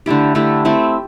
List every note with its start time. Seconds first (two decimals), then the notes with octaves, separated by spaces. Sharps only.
0.06 D3 A3 E4 G4
0.35 D3 A3 E4 G4
0.65 A3 C4 E4